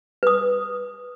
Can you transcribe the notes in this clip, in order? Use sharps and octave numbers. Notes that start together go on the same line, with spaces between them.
B4 D#6